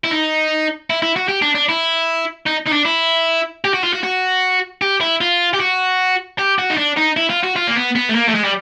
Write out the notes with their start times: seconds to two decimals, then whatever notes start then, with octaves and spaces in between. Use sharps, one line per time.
0.04 E4
0.11 D#4
0.90 E4
1.02 E4
1.16 F#4
1.28 G4
1.42 D4
1.55 D4
1.69 E4
2.47 D#4
2.67 D#4
2.73 D4
2.86 E4
3.65 G4
3.74 F#4
3.84 F4
3.93 F#4
4.04 F#4
4.82 G4
5.01 E4
5.21 F4
5.54 G4
5.60 F#4
6.39 G4
6.59 F#4
6.70 D#4
6.77 D4
6.97 D#4
7.17 E4
7.30 F4
7.43 F#4
7.56 F4
7.67 A#3
7.76 B3
7.96 B3
8.09 A3
8.15 A#3
8.29 A3
8.35 G#3
8.44 G3